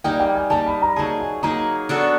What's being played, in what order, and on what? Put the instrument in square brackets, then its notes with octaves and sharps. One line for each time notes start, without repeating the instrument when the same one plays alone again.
[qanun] G3 A#3 D#4 [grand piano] G5
[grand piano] G5
G#5
[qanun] G3 A#3 D#4 [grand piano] A5
[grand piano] B5
A#5
[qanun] F#3 A#3 D#4 G#4 [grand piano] A5
[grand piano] G#5
[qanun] F#3 A#3 D#4 G#4 [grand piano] A#5
[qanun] B3 D4 F#4 A4